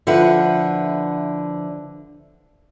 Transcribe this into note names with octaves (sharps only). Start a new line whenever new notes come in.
D3 F3 E4 B4 F#5